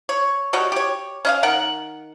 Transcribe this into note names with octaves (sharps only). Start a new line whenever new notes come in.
C#5
G3 F#4 C#5 D#5
G4 C#5
C#4 D#5 F5
D#3 A#4 F#5